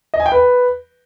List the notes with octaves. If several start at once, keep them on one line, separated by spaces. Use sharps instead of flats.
D#5
G#5
G5
B4